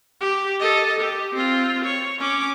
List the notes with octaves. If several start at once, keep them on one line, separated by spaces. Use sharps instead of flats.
G4
A4 D#5
G4
C4 F4
C#5
C#4 D6